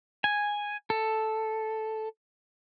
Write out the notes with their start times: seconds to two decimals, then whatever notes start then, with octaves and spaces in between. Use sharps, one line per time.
0.24 G#5
0.90 A4